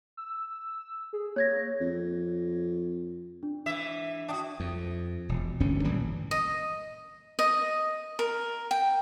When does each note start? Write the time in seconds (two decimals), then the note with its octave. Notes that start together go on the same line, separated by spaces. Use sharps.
0.17 E6
1.13 G#4
1.36 A#3 C#5 G#6 A#6
1.81 F2
3.43 D4
3.66 G#2 E3 E5
4.28 D4 F#4 E5 G5 D#6
4.60 F2
5.29 E1
5.60 D1 G1 G2 C#4
5.84 G#1 A#2 E3 G3
6.31 D#5
7.39 D#5
8.19 A#4
8.71 G5